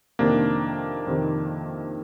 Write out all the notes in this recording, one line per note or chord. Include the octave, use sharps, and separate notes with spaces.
F2 C3 D#3 A#3 D4
F2 C3 D#3